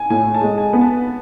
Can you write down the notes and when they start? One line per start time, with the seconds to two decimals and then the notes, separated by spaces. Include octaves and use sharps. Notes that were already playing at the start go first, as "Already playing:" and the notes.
Already playing: G#5
0.10 A2 G#5
0.34 A5
0.41 G#3
0.58 G#5
0.73 B3
0.81 A5